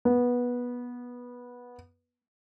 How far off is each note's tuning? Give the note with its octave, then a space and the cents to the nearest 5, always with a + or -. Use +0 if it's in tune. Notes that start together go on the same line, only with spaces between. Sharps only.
B3 -15